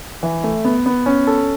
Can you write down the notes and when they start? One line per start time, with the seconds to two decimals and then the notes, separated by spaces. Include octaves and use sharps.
0.23 E3
0.44 A3
0.65 B3
0.86 B3
1.06 C#4
1.27 A4